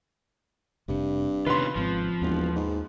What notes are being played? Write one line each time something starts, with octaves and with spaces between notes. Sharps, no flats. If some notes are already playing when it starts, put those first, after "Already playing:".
F1 G2 C3
C3 D#3 B3 C#4 F4 B4 C6
G#1 G#2 F3 C4
E1 D#2
G#2